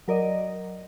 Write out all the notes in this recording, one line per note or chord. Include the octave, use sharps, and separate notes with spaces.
F#3 A#4 D5 D#5